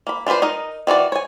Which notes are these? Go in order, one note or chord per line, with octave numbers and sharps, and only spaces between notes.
A#3 B5
D4 F4 A4 B4 C5
D#4 A#4 D#5
D#3 E3 F#4 D5
C#5 G#5